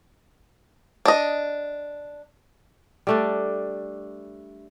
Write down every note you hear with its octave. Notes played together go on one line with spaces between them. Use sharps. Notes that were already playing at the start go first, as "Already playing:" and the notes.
D4 D#5
G3 A3 D4